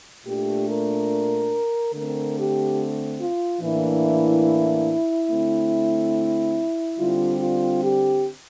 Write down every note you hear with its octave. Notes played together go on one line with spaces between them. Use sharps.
A#2 A3 D4 G4
A#4
D3 A3 C4 A#4
G4
F4
A2 E3 A#3 D4 E4
D3 A3 C4
D3 G3 C4 F4
F4
G4